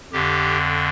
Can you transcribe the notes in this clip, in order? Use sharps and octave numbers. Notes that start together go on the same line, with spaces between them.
F2 D3 G4